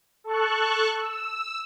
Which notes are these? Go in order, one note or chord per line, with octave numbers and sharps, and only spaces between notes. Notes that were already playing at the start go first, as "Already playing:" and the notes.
A4 A5 C#6 F#6
E6